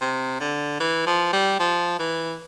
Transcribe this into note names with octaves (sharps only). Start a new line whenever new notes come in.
C3
D3
E3
F3
G3
F3
E3